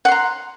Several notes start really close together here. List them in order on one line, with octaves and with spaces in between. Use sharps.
F#5 C6 A#5